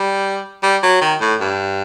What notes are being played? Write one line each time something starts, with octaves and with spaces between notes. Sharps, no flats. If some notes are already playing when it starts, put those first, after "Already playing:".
Already playing: G3
G3
F#3
D#3
A2
G2